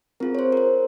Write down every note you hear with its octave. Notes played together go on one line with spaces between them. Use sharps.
C4 F4 G#4 A#4
C#5
C5
A#4
C5